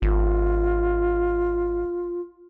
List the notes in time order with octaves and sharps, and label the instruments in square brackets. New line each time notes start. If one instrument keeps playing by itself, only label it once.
[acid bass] G#1 [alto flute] F4